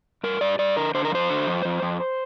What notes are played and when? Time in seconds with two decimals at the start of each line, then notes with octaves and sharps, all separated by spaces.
0.24 G2 A#4
0.41 G2 D5
0.59 G2 D5
0.76 D3 A#4
0.95 D3 C5
1.05 A#4
1.12 F2 C5
1.30 D3
1.47 F2
1.65 F2
1.82 F2